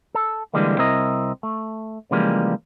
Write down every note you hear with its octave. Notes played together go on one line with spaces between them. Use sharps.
A4
D3 E3 F3 G3 G#3 A#3
C2 C4 E4 A#4 D#5
A3
C#3 E3 F3 G3 G#3 A#3